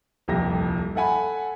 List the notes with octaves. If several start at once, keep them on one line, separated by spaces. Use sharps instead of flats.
D#1 C2 F2 G4 A#6
A4 E5 F#5 G#5 B5